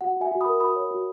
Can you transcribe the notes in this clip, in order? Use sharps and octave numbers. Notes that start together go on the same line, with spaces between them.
F#4 F#5
F#4 E5 G#5
F#4
A#4 B5 D#6
F#4 B5 D#6
C#5
F#4